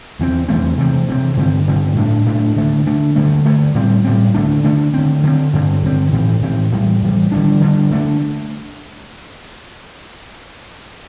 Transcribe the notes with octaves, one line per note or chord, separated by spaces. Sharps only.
E2 E3 A3 C4
E2 E3 A3 C4
C3 E3 C4
C3 E3 C4
G2 D3 C4
G2 D3 C4
A2 A3 D4
A2 A3 D4
D3 A3 D4
D3 A3 D4
G2 D3 A3
G2 D3 A3
A2 G3 C4
A2 G3 C4
D3 A3 D4
D3 A3 D4
D3 C4
D3 C4
G2 D3 C4
G2 D3 C4
A2 E3 C4
A2 E3 C4
A2 E3 G3
A2 E3 G3
D3 G3 D4
D3 G3 D4
D3 A3 D4